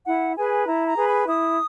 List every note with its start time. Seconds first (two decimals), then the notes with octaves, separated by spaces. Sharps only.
0.06 E4 F#5
0.36 G#4 B4 G#5
0.66 E4 A#5
0.87 A#5
0.96 G#4 B4
1.07 B5
1.26 E4 D#6